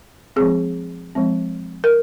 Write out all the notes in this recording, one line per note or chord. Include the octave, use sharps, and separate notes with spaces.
F3 G#3 C4 G#4
F3 G#3 C4
A#4